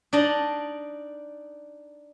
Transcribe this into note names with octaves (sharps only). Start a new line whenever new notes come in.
D4 D#4 D5 D#5